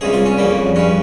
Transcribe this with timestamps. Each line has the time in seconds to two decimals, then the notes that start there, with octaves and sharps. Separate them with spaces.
0.01 C#2 C3 G3 G#4
0.13 F4
0.25 C#4
0.38 F2 C#3 G3 A#3
0.75 G2 G3 C#4